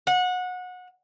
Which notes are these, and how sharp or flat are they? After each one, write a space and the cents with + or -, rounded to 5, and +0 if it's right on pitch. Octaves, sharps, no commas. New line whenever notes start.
F#5 -25